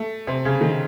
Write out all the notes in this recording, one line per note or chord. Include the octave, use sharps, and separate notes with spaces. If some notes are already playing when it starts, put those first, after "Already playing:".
Already playing: A3
C3
C#3
D#3